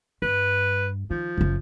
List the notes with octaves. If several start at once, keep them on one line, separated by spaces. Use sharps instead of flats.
G2 B4
D#3 F3
F#1 F#2